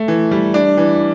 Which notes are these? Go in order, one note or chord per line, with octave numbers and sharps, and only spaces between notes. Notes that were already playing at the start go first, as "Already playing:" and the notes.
Already playing: A3
E3
G3
D4
E3